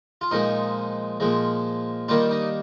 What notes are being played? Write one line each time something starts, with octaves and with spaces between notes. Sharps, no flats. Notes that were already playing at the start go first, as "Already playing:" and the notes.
F4
A#2 F3 G#3 D#4
A#2 F3 G#3
D#3 G3 A#3 D4 F4
D#4